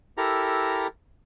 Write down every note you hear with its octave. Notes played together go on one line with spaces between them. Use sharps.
E4 G4 A4 A#4 A#5